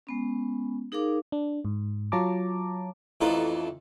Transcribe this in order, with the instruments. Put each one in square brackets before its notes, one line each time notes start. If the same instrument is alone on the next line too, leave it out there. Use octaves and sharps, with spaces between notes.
[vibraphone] G#3 B3 C#4
D#4 G#4 A#4 F5 D6
[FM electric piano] D4
G#2
F#3 F4 C#5 A5 A#5 D6
[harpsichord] A1 F2 E3 D#4 F4 A4